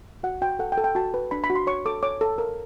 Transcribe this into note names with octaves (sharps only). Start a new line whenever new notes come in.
F#4 F#5
F#4 G5
A4 F#5
G5
A4
G5
F#4 A5
B4
D4 B5
B5
F#4
C6
C#5 C#6
A4 D6
C#5 D6
A4
A#4